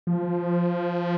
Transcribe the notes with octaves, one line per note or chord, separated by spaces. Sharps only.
F3